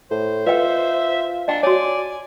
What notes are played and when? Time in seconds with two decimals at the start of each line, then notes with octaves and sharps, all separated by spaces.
0.11 A2 C5
0.47 F4 B4 D#5 E5 G5
1.48 D4 D#5 G5
1.63 F#4 C#5 D5 G#5